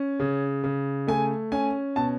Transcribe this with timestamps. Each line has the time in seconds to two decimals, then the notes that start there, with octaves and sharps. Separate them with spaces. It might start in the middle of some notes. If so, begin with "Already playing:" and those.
Already playing: C#4
0.19 C#3
0.64 C#3
1.07 A3 G#5
1.52 C#4 G#5
1.96 B2 A5